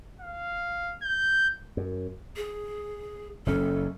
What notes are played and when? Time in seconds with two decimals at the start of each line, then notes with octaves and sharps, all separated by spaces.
0.21 F5
1.02 G6
1.77 F#2
2.36 G#4
3.46 F#1 F#2 C#4 A4